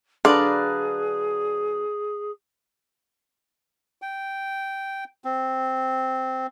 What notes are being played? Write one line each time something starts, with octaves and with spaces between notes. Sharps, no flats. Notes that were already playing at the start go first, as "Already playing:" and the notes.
D3 F#3 D4 G#4 B4 D5 F5 A#5
G5
C4